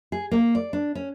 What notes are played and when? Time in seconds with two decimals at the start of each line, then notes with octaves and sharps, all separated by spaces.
0.12 G#4
0.31 A#3
0.55 D5
0.73 D4
0.95 C#4